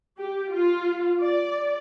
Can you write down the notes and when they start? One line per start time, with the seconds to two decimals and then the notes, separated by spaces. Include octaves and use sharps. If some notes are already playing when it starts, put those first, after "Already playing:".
0.18 G4
0.51 F4
1.20 D5